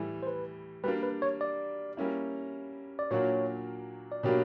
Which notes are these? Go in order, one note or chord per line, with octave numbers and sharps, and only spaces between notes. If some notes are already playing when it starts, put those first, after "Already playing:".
Already playing: A2 E3 G3
C5
B4
G3 A#3 D4 B4
B4
C#5
D5
G3 A#3 C#4 E4
D5
A#2 F#3 A#3 D4 F#4 C#5
D5
B2 F#3 A#3 D4 G4 C#5